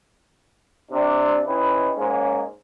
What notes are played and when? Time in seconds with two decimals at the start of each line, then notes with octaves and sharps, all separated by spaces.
0.92 C3 D4
1.46 C#4 D#4 E4 G4 B4
1.96 G#2 G#3 A#3 C#4